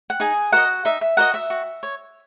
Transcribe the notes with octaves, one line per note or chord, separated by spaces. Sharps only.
F#5
D#4 G#4 G#5
F#4 A#4 D#5 F#5
D#4 E5
E5
F#4 A#4 D#5 F#5
E5
F#4
C#5